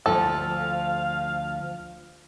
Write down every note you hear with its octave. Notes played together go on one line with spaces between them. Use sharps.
D2 F3 A4 F5